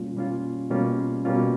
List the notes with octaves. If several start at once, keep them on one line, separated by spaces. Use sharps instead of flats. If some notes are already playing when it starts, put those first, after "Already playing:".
Already playing: B2 G3 A#3 C#4 F4
B2 G3 A#3 C#4 F4
B2 G3 A#3 C#4 F4
B2 G3 A#3 C#4 F4